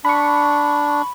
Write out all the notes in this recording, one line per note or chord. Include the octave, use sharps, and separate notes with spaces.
D4 B5 C#6